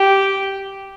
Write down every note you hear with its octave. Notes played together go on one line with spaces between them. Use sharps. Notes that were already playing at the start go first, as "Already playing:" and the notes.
Already playing: G4